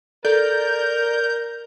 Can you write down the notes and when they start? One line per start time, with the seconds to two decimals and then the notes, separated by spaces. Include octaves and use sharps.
0.25 A4 A#4 D5 G6